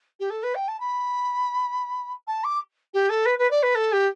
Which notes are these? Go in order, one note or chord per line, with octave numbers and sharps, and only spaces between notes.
G4
A4
B4
G5
A5
B5
A5
D6
G4
A4
B4
B4
D5
B4
A4
G4